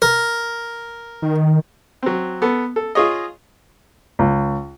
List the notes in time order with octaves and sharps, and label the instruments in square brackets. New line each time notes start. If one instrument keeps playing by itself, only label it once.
[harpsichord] A#4
[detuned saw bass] D#3
[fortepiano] F#3 C4
B3 A4
A4
F4 G#4 C#5 D#5
C#2